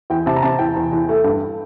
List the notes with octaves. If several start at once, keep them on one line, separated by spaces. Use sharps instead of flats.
E2 G5
C3 A5
A#5
C3 A5
E2 G5
E2
E2
A3
G2